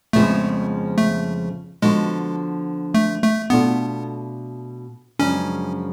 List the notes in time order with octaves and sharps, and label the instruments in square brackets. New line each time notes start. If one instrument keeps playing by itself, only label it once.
[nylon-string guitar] F2 C#3 F3 G#3 B3 [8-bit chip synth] A3
[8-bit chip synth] A3
[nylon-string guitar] D3 F3 B3 F#4 [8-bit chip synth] G#3
[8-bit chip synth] A3
A3
[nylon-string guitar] B2 A3 D4 F4 [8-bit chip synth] B3
[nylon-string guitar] F#2 C#3 F3 G#3 D4 [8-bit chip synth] C#4